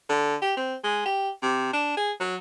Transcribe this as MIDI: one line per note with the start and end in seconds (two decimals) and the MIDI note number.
0.09 0.35 50
0.42 0.55 67
0.57 0.75 60
0.84 1.04 56
1.06 1.29 67
1.42 1.69 48
1.73 1.95 62
1.97 2.12 68
2.20 2.36 54